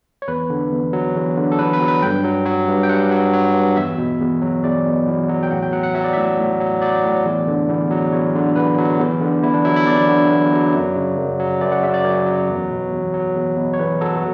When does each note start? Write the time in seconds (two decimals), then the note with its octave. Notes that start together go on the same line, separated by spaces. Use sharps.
0.22 C#5
0.28 E2 B4
0.50 D3
0.72 E2
0.93 F#3
1.15 E2
1.37 D3
1.52 A4
1.59 E2 B4
1.73 B4
1.80 F#3
1.88 B4
2.02 G2 G5
2.24 F#3
2.46 F#3
2.67 G2
2.83 G5
2.89 G2 F#5
3.11 F#3
3.33 F#3
3.55 G2
3.77 E2 E5
3.98 B2
4.20 E2
4.42 F#3
4.64 E2 D5
4.85 B2
5.07 E2
5.29 F#3
5.43 G5
5.51 A2 F#5
5.62 G5
5.73 F#3 F#5
5.83 F#5
5.94 F#3 E5
6.04 D5
6.13 A2 E5
6.38 A2
6.60 F#3
6.82 F#3 D5
7.03 A2
7.25 E2
7.47 D3
7.69 E2
7.91 F#3
8.12 E2 C#5
8.35 D3
8.56 E2 B4
8.78 F#3
8.99 E2
9.21 D3
9.43 E2 E4
9.54 D4
9.65 F#3 E4
9.76 E4
9.87 E2 D5
10.09 D3
10.30 E2
10.52 F#3
10.74 F#2
10.96 C#3
11.18 F#2
11.39 F#3
11.61 F#2 D5
11.72 F#5
11.83 C#3 E5
11.94 D5
12.05 F#2 C#5
12.26 F#3
12.49 E2
12.70 B2
12.92 E2
13.14 F#3
13.36 E2
13.57 B2
13.74 C#5
13.79 E2 B4
14.01 F#3 A4
14.17 F#4